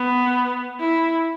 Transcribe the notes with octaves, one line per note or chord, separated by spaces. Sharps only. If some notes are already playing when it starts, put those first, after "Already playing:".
Already playing: B3
E4